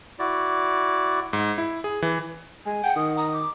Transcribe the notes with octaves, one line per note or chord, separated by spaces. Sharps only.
E4 F#4 D5
G#2
E4
G#4
E3
G#3 G#5
F#5 G5
D#3 D#6
A#5 D#6
D6